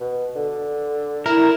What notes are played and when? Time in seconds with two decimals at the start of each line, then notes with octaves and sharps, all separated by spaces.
0.01 B2
0.36 D3
1.26 E4 A#4 E7